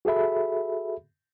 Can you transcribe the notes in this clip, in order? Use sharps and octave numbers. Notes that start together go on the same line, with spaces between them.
F#4 G#4 A4 E5 B5